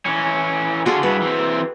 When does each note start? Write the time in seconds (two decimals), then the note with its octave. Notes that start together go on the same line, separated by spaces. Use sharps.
0.05 E3 C#4
0.86 D3 F4 F#4 G#4 A4
1.03 G2 E4 B4
1.22 E3 C4